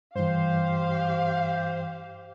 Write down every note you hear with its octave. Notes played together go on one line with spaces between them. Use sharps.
G2 E3 G4 C5 F5